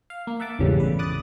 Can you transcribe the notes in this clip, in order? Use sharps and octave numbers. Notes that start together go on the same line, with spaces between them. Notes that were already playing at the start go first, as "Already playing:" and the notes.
F5
A#3
E5 F#5 A5 D6
G#1 E2 A2 C#3 G3
B4
D6 D#6 F#6 A6